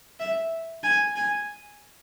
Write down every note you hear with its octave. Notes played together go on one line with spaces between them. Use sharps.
E5
G#5
G#5